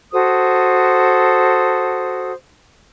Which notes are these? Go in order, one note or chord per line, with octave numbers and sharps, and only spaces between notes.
F#4 A4 C5 D#6